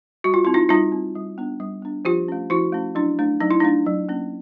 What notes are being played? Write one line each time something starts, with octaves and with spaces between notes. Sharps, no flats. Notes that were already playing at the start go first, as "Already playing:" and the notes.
G3 F#4
F4
C4 E4
D#4 F4
G3 D#4 F4
C4
G3
B3 D4
G3
B3 D4
F3 F4 G4
A3 C#4
F3 E4 F#4
A3 C#4
F#3 D4 E4
A3 D4
F#3 D#4
E4
A3 D4 D#4
F#3
A#3 C#4